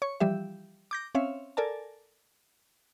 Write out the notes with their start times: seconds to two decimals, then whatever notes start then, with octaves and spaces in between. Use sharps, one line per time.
0.02 C#5 C#6
0.20 E3 F3 G3 G4 E5
0.91 D6 G6 A#6
1.15 C4 C#4 C#5 E5 F5
1.57 A4 A#4 D5 G#5 A5